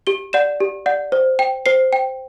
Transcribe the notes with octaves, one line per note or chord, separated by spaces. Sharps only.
G4 G7
D5 F#5 E7
G4
D5 F#5
C5
G5
C5 C7
G5